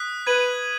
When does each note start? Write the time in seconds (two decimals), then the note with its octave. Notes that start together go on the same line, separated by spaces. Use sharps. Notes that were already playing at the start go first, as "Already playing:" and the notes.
Already playing: D#6 F#6 B6
0.26 B4 G#6 D#7 F#7